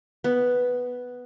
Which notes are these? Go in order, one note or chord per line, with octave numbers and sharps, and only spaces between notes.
B3